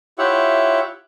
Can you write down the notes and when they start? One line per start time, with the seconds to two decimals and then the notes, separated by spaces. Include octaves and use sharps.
0.19 E4 F4 G4 C#5 E5 F#5